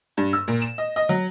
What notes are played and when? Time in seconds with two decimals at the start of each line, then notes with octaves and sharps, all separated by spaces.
0.17 G2
0.33 E6
0.48 A#2
0.62 E7
0.78 D#5
0.96 D#5
1.09 F#3